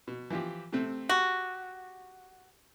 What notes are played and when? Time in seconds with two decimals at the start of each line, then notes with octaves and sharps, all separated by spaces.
0.08 B2
0.30 E3 F3 G4
0.73 C3 A3 C4
1.09 F#4 G4